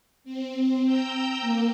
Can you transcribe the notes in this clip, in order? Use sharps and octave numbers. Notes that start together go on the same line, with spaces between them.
C4
G5 A#5 E6 G6
A#3